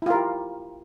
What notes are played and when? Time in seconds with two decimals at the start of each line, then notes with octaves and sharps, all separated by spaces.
0.02 E4
0.06 F4
0.10 A#4
0.14 G4